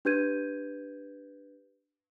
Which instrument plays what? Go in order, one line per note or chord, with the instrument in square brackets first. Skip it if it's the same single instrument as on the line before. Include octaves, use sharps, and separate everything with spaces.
[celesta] D4 G4 B4 G6 G#6 D#7